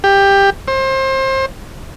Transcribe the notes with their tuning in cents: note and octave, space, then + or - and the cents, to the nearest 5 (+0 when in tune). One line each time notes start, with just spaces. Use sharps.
G4 +15
C5 +30